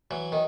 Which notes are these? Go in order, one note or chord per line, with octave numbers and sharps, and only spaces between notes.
E3 F#3
D#3